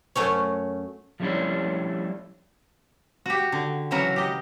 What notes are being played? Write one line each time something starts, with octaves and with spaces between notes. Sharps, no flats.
F#2 A3 C#4 C#5
F3 G3 A3 C#4 D4 E4
F#4 G4
D3
C#3 E3 F#3 F#4 A#4
G4 D#5